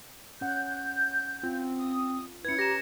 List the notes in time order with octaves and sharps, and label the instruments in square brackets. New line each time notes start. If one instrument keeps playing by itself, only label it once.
[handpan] C#4 F#5 [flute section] G6
[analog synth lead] C4 [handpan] F4
[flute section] D#6
[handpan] C#4 B4 [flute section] E4 [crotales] G#6 C#7
[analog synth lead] G4 [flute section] A#5 [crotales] A#6 E7